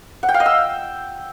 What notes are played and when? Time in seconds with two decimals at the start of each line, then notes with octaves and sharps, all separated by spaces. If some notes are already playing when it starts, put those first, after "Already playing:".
0.23 F#5
0.29 G5
0.34 F5
0.40 D#5
0.46 E6